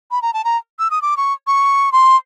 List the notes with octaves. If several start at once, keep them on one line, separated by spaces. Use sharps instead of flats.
B5
A#5
A5
A#5
E6
D#6
D6
C#6
C#6
C6